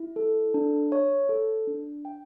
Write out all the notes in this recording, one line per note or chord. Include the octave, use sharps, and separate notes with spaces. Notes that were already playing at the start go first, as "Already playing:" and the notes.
Already playing: E4
A4
D4
C#5
A4
D4
G5